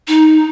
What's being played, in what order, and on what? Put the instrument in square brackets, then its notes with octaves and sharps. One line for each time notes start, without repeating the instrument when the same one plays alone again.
[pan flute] D#4